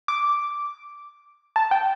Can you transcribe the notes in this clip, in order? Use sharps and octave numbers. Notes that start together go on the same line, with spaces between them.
D6
A5
G5